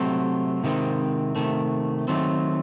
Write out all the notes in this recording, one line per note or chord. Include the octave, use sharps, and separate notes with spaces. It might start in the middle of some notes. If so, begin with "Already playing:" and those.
Already playing: C3 F#3 A3 C4
C3 D#3 G#3 C4
C3 D#3 A3
D#3 F#3 A3 C4